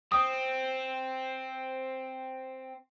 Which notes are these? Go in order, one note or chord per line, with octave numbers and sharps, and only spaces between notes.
C4 D#6